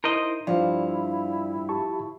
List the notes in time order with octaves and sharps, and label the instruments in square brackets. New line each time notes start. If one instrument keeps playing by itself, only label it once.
[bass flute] D#4 [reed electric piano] E4 [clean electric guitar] A#4 C5 D#5
[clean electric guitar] G2 [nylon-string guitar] F3 [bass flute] E4 [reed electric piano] D5 F5
[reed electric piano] G4 A5 C#6